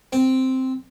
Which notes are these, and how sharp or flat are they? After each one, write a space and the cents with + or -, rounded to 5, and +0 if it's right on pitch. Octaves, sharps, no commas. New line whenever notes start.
C4 -5